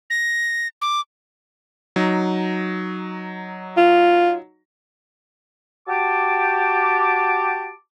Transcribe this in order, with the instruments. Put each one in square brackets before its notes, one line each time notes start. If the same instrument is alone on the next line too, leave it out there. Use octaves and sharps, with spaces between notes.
[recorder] A#6
D6
[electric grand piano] F#3 D#4
[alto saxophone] F4
[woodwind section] F#4 G4 A5 D6